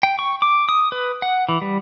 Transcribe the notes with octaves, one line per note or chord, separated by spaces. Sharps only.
G5
C#6
D6
D#6
B4
F#5
E3
G3